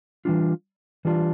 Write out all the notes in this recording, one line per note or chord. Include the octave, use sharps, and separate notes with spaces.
E3 G3 D4 F4
E3 G3 D4 F4